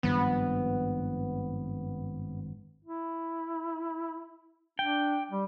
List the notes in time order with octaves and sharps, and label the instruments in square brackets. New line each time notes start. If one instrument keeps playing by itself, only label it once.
[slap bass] G#1 G2 F3 [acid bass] B3
[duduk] E4
[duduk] D4 [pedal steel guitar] G5
[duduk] G3